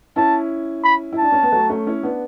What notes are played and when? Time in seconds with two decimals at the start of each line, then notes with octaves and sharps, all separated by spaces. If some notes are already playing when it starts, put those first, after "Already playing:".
0.16 C#4 E4 A5
0.85 B5
1.13 E4
1.19 D4 A5
1.32 C#4
1.43 B3
1.52 F#3 A3
1.70 A3 C#4
1.87 C#4 E4
2.03 B3 D4